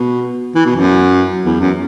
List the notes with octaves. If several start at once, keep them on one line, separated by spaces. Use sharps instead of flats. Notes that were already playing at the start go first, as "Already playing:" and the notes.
Already playing: B2
E3
B2
F#2
E2
F#2